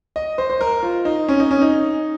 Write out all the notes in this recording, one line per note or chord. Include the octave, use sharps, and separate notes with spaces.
D#5
C5
C5
A#4
F4
D#4
C#4
D#4
C#4
D#4